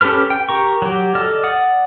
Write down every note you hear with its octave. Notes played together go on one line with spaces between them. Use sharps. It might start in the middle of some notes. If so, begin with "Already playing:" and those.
C#4 G4 A4 B4 F6
G5
G4 A#4 C#6
F#3 G4
A4 D5 D#5 F6
D5 F#5 D#6